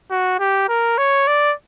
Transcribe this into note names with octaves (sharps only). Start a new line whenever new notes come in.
F#4
G4
A#4
C#5
D5